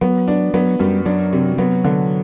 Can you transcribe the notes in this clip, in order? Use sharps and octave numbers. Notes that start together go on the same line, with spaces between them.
F#3 B3
D4
F#3 B3
F#2 G3
F#3 D4
C3
F#3 B3
D3